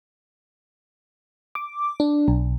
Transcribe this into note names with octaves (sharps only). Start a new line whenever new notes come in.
D6
D4
B1